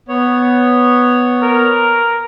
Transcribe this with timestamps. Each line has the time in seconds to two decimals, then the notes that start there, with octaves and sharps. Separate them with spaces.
0.08 B3 C#5
1.42 A#4